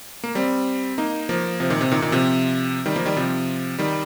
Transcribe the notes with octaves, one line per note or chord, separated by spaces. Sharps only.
A#3
G3 C4
A#3 D#4
F3 A#3
C3 F3
A#2 D#3
C3
A#2 D#3
A#2 D#3
C3 F3
D#3 G3
F3 A#3
D#3 G3
C3 F3
D#3 G3